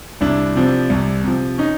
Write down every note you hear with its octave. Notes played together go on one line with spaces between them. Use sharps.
C2 D4 E4
C3 F3
C2
C3 F3
C#4 D#4